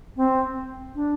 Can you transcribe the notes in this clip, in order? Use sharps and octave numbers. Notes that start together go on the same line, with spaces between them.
C4
D4